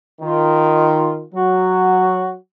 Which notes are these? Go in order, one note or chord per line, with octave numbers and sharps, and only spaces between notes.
D#3 F4
F#3 F#4